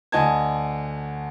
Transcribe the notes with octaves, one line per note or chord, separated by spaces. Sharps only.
D2 D#5 G#5 A5 G#6